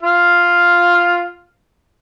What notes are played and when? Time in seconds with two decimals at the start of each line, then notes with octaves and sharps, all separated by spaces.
0.03 F4 F5